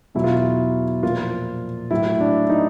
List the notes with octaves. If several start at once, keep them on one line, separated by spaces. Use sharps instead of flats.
E2 B2 F#3 E4
F4
E4
A#2 F3 F4
A2 F#3 E4
D4
D#4